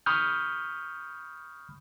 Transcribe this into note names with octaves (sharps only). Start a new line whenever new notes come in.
B5 C#6 D#6 F6 G6